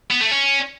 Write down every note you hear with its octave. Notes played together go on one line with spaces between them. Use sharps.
B3
A3
C#4